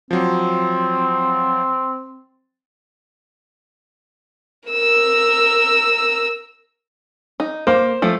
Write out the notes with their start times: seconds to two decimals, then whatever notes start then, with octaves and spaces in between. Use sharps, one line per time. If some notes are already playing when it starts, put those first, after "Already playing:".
0.11 F3 F#3 C4
4.69 A#4 E6
7.40 D#4
7.67 A#3 C5
8.02 F3 A3